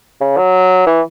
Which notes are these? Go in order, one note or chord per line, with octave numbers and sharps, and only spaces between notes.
C#3
F#3
E3